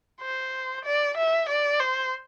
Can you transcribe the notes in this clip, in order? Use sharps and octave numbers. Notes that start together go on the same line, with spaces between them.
C5
D5
E5
D5
C5